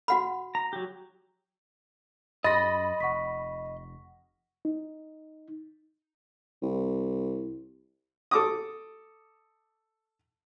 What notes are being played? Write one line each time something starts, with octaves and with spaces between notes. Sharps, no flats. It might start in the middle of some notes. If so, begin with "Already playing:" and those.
F#4 F#5 B5
A#5
F#3 G4
F#2 D#5 B5 C6 A6 A#6
F1 F#5 C#6 B6
D#4
C2
A4 D6 D#6